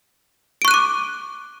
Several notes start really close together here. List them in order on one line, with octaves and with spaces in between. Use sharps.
D7 C#6 F#6 D#7 D6